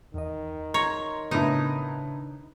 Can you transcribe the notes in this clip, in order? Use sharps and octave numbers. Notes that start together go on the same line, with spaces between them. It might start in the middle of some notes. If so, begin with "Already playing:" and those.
E2 D#3 D#5
C#5 A#5 C6 C#6
A2 C#3 B3 D4 D#4